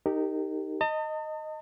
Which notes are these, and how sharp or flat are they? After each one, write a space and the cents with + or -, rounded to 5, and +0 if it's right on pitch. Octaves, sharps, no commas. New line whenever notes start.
D#4 +0 G4 +0 A#4 -35
D#5 +0 A5 +45